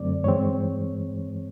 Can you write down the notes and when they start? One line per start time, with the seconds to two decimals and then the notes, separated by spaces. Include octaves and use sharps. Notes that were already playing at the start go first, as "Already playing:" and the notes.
Already playing: F#2 D3 F#3 A3 C4 D5
0.24 G2 E3 G#3 C4 C#5